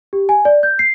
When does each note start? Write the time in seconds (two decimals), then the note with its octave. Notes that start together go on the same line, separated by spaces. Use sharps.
0.13 G4
0.29 G#5
0.45 D5
0.63 G6
0.79 C7